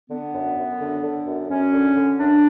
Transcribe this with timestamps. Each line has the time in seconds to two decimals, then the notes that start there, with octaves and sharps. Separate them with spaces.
0.10 D3 B3
0.34 F#2
0.57 F#2
0.80 D3
1.03 D3
1.26 F#2
1.50 F#2 C#4
1.73 D3
1.96 D3
2.19 F#2 D4